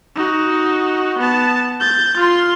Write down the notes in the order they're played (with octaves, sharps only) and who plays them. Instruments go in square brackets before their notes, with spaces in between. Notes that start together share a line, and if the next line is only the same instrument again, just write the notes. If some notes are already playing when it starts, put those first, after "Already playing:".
[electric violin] D#4 F#4
B3 A5
G6 A6
F4 C6